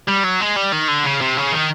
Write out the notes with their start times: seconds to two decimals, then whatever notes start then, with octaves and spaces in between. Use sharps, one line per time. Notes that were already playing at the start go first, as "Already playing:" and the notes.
0.08 G3
0.24 F#3
0.41 G#3
0.56 G3
0.72 D#3
0.88 D3
1.04 C#3
1.21 C3
1.37 C#3
1.52 D#3